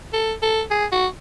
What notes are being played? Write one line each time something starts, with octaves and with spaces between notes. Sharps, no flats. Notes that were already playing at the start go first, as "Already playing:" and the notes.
A4
A4
G#4
F#4